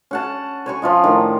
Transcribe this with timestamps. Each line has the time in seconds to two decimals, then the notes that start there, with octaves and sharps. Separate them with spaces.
0.11 C#4 F#5 A5
0.66 C#5 G#5 C#6
0.82 F3 F4 D#5
1.03 A2 D#3 D5